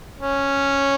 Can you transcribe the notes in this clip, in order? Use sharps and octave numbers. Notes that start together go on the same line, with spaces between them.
C#4